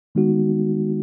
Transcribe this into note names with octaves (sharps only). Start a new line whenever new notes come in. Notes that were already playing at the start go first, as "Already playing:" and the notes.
D#3 G#3 B3 D#4 F#4